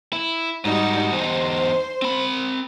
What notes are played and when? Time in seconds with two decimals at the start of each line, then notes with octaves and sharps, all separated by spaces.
0.13 E4
0.65 G#2 G3 D#4 F#4
1.12 E2 D#4 C5
2.02 C4 B5